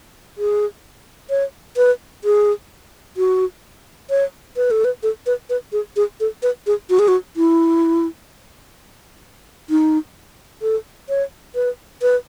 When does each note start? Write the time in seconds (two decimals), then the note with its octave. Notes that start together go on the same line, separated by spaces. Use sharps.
0.38 G#4
1.30 C#5
1.77 B4
2.24 G#4
3.17 F#4
4.10 C#5
4.56 B4
4.71 A4
4.85 B4
5.03 A4
5.26 B4
5.50 B4
5.73 G#4
5.96 G#4
6.20 A4
6.43 B4
6.67 G#4
6.90 F#4
6.99 G#4
7.08 F#4
7.36 E4
9.70 D#4
10.62 A4
11.09 C#5
11.55 B4
12.02 B4